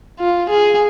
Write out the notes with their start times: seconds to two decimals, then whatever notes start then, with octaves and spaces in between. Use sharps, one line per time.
0.20 F4
0.50 G#4